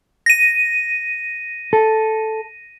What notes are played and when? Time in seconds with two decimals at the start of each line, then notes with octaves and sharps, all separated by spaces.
0.26 A#6 D#7
1.73 A4